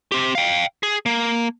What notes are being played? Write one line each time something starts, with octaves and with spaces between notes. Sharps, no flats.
C4 G4
F5 G5
G#4
A#3